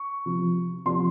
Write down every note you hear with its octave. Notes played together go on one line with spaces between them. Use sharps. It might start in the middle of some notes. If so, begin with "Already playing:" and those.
Already playing: C#6
C3 F3
C3 F3 C6